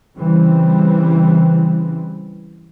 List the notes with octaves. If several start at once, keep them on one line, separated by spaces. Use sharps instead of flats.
C#3 E3 G3 C4